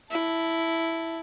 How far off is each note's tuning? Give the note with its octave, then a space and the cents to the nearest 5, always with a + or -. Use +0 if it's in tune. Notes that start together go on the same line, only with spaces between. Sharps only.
E4 +0 A5 +0